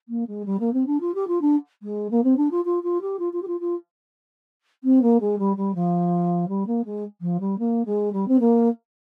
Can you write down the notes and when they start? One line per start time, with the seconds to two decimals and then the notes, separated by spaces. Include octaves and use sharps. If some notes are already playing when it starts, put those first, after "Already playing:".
0.09 A#3
0.27 G#3
0.46 G3
0.60 A#3
0.73 C4
0.87 D4
1.01 F4
1.14 G4
1.28 F4
1.41 D4
1.83 G#3
2.11 A#3
2.24 C4
2.37 D4
2.51 F4
2.65 F4
2.83 F4
3.02 G4
3.19 F4
3.33 F4
3.42 G4
3.47 F4
3.60 F4
4.84 C4
5.02 A#3
5.21 G#3
5.39 G3
5.57 G3
5.75 F3
6.48 G3
6.67 A#3
6.85 G#3
7.21 F3
7.40 G3
7.58 A#3
7.85 G#3
8.13 G3
8.28 C4
8.40 A#3